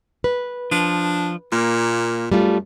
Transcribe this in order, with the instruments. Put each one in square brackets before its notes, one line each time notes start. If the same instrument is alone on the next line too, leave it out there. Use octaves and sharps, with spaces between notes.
[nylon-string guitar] B4
[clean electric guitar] F3 [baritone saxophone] D4
[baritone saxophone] A#2 [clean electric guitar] A#3
[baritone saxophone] F#2 [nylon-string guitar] G3 A3 F4